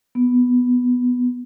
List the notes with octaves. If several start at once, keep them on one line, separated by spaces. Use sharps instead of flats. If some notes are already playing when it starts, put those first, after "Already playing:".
B3